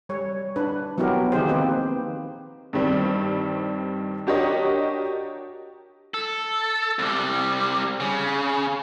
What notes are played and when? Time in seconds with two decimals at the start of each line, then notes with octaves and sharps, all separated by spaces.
0.09 G3 C#5
0.56 D4 B4
0.98 F#3 B3 E4 F#4 G4 A#4
1.32 D#3 F3 D#4 G4 G#4 C5
1.48 A#3 C4 G4 B4 C5
2.73 G2 D#3 G3 C4
4.27 D4 F#4 G4 A#4 C#5 D#5
6.14 A4
6.99 C2 G3
8.00 C#3